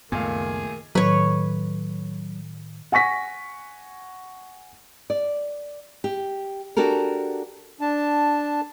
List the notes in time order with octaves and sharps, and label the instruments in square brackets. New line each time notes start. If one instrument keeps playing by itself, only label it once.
[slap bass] C#2 F#2 B3 [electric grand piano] A#2 A3 F5 [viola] D#3 [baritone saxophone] G#4
[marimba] A2 D#3 [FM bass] F#3 [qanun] B4 C#5
[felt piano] F#5 G#5 C#6 A#6 B6
[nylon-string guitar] D5
G4
D4 F#4 G4 A4 A#4
[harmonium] D4 A5